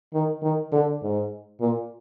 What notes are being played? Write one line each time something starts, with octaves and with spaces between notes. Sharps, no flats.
D#3
D#3
D3
G#2
A#2